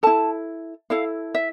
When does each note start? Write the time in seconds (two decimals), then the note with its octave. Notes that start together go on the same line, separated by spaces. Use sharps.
0.03 E4 A4 A5
0.90 E4 A4 F5
1.35 E5